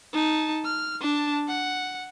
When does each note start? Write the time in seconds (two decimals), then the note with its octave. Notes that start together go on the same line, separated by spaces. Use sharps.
0.13 D#4 A5
0.65 F6
1.01 D4 A5
1.48 F#5